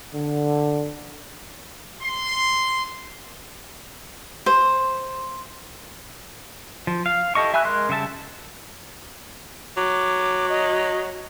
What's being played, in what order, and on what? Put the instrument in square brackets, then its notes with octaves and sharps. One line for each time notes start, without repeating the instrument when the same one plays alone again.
[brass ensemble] D3
[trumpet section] C6
[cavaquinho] C5
[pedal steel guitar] F3
F5
E4 G4 A4 D#5 C#6
E5 G#5 B5 E6 F#6
G#3 A#4 C6 F#6
C#3 G3 E5 A5
[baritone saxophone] F#3 [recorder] D6
[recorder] D#5